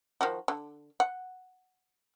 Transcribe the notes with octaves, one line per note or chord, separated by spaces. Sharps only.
D#3 F3 F#4
D3
F#5